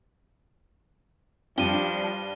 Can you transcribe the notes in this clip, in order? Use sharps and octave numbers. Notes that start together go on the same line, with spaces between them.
G2 F3 D4 D#7 G7